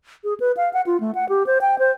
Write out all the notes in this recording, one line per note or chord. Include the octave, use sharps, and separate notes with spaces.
G#4
B4
F5
F#5
F4
A3
F#5
G4
C5
G5
C5